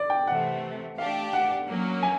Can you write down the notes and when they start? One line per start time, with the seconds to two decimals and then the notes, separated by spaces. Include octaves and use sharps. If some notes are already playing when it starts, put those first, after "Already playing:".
Already playing: D5
0.10 G5
0.27 C3 E3 A3 F#5
0.97 A3 D4 G4 F5
1.33 F#5
1.68 F#3 A#3 C#4
2.03 G#5